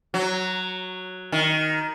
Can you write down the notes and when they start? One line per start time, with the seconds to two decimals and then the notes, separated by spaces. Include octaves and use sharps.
0.14 F#3
1.32 D#3